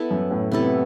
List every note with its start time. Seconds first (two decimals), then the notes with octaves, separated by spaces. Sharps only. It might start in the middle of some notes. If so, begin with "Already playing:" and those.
Already playing: B3 E4 A4
0.11 F#2
0.31 A2
0.52 C3 B3 E4 A4